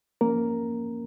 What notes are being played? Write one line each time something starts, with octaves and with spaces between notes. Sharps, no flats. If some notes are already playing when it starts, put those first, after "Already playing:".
F3 A#3 C#4 A#4